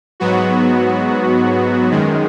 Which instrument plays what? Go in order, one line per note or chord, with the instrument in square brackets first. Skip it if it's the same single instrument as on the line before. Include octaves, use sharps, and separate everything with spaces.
[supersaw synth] G#2 F#3 B3 F#4
F#2 D#3 G#3